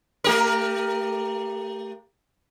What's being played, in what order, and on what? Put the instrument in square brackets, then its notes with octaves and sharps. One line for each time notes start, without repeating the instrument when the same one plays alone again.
[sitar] A3 G4 A#4